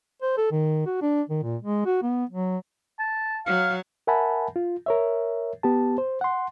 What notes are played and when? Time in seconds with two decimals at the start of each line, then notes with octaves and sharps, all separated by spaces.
0.22 C5
0.37 A4
0.51 D#3
0.86 F#4
1.02 D4
1.29 D#3
1.43 A#2
1.61 G#3
1.86 F#4
2.02 B3
2.30 F#3
2.99 A5
3.46 F#3 F5
4.07 A#4 E5 F#5 G#5 A5 B5
4.56 F4
4.86 A#4 C#5 E5
5.63 B3 G4 A5
5.98 C5
6.21 F#5 C6